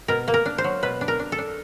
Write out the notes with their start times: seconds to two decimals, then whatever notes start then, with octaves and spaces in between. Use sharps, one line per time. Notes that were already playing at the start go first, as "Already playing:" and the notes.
0.08 B2 A#4
0.28 A#3
0.34 A#4
0.46 D4
0.58 C5
0.64 F#3
0.83 B2 B4
1.01 D4
1.08 A#4
1.19 D4
1.32 A4
1.38 D4